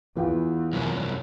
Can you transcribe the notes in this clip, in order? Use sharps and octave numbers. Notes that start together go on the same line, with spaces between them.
E2 E3 F4
C2 F#2